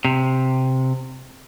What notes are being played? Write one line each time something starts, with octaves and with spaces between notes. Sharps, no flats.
C3